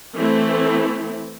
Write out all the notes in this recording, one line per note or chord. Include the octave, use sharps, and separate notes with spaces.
E3 A3 C4 E4